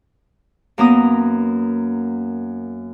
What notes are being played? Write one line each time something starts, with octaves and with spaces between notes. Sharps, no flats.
F#2 A#3 B3 A#5 D#6